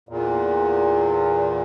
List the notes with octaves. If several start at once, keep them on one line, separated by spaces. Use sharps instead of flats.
E2 A#2